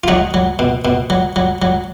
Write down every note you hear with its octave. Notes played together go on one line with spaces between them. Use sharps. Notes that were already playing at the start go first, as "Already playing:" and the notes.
F4
F#3 D#4 F#4
F#3
B2
B2
F#3
F#3
F#3